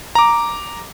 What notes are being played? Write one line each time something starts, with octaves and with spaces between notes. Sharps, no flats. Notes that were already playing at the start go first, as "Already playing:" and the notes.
A#5 D6